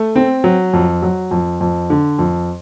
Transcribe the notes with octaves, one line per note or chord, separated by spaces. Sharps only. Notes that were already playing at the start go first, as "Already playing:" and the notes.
Already playing: A3
C4
F#3
F2
F#3
F2
F2
D3
F2